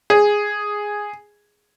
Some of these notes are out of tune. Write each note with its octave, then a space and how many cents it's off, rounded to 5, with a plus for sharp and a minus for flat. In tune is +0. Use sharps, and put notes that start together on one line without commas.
G#4 -5